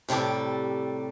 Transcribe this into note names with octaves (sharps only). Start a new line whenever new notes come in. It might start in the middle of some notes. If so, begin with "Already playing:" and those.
A2 C3 G3 A4 D5